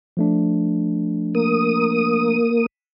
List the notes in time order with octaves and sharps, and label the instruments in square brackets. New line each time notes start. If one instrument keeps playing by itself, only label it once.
[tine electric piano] F3 A3 D4
[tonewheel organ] A#3 D#6